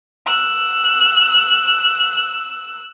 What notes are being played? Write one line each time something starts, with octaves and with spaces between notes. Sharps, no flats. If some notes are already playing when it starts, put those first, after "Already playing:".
E6 F#6